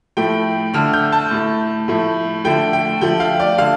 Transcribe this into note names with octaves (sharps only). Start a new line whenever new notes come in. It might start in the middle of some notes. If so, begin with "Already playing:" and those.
A2 F3 A3 G5
D3 A3 F6
G6
A5
A2 A3
A2 F3 A3
D3 F3 A3 G5
G5
D3 F3 A3 G5
F5
D5
D3 A3 F5